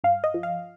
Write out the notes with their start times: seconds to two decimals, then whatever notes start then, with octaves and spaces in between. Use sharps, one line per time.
0.04 G2 F5
0.24 D#5
0.34 F3
0.43 F5